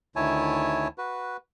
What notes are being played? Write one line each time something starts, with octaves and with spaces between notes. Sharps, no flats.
D2 D#3 E4 C#5 G#5 A5
F#4 B4